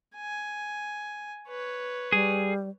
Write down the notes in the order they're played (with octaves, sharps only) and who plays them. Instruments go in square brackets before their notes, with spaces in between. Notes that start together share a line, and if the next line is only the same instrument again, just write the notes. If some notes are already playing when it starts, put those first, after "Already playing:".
[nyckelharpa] G#5
B4 C#5
[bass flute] G3 [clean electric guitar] G#4